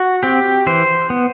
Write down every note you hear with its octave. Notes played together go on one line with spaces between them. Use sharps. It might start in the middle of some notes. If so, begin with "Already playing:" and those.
Already playing: F#4
C4 G4
E3 C5
B3